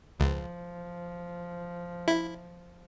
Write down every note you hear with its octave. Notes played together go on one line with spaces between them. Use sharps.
C#2 F3
E4